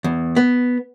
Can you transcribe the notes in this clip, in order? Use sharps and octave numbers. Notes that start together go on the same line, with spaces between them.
E2
B3